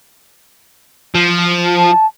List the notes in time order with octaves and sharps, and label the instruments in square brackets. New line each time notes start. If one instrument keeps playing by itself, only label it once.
[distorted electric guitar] F3
[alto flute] A5